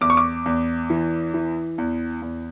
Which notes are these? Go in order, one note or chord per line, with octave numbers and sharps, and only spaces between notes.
E2 D6
C#6
D6
E2
E3
E3
E2
E2